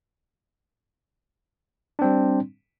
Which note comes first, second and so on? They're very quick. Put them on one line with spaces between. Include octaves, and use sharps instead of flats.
D4 C4 G3